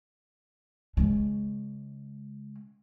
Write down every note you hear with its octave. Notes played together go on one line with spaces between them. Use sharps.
C#3 G#3